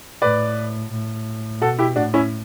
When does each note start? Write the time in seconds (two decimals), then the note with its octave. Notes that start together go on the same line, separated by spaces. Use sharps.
0.22 A2 B4 D5
0.91 A2
1.61 B2 F#4 A4
1.79 E4 G4
1.96 A2 D4 F#4
2.14 C#4 E4